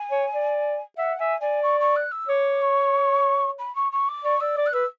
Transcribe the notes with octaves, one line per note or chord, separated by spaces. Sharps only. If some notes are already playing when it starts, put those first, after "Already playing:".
Already playing: G#5
C#5
D5
E5 F#5
E5 G#5
D5 G#5
C#6
C#6
F#6
E6
C#5 D6
C#6
B5
C#6
C#6
D6
D5 C#6
D5 E6
D5 D6
F#6
B4 E6